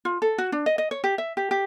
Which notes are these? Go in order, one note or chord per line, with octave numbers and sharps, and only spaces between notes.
F4
A4
F#4
D4
D#5
D#5
C#5
G4
E5
G4
G4